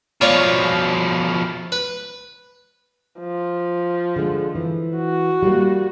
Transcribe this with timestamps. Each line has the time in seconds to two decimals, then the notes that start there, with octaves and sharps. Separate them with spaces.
0.21 B2 F3 F4 C#5 D5
1.72 B4
3.20 F3
4.16 D3 G#3
4.55 E3
4.96 F#4
5.42 G3 A3 A#3